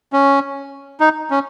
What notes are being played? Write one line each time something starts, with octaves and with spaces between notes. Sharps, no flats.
C#4
D#4
C#4